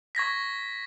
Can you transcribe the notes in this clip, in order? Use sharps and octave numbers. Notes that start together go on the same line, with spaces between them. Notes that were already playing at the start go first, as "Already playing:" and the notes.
C#6 G#6 A#6 B6